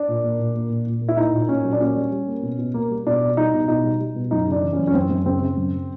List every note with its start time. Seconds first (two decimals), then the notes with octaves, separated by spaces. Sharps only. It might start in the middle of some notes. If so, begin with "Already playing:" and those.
Already playing: D4
0.08 A#2
0.24 A#3
0.39 A#2
0.55 A#3
0.71 A#2
0.87 A#2
1.02 A#3
1.08 E4
1.17 A#3 D#4
1.33 A#2
1.49 A#2 C#4
1.64 F#3
1.73 D4
1.80 A#3 C#4
1.97 G3
2.12 G3
2.28 A#3
2.43 B2
2.59 B2
2.74 A#3
2.90 G3
3.07 B2 D4
3.22 B2
3.37 G3 D#4
3.53 B2
3.68 B2 D#4
3.84 G3
4.00 G3
4.16 B2
4.31 F#2 D#4
4.47 C#3 D4
4.63 E3
4.73 C#4
4.79 F#2
4.87 C#4
4.94 F#2 C4
5.11 F#2
5.25 C#3 C4
5.41 C#3
5.57 F#2